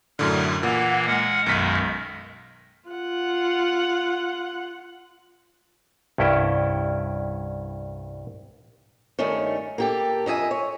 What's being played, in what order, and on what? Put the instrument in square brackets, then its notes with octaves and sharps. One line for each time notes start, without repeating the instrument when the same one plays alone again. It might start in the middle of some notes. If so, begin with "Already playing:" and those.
[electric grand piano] F#2 A2 D3 [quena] F6
[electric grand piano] A#2 [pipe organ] E3 A#3 [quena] F#5
[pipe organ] G#3 F#5 [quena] F6
[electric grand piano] B1 B6 [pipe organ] F#2 D#3 G#3
[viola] F4 F#5
[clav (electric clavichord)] C2 G2 C#4 E4 G5
[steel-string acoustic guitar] G2 D#3 A3 C#4
A#3 G4 A4
F2 D#5 E5 G#5
C#5